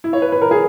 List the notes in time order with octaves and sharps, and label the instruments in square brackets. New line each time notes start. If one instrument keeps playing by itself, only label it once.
[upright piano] E4
C#5
B4
B4
A#4
G#4